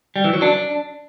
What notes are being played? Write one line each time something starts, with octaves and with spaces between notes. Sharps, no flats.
G3
E3
F#3
D4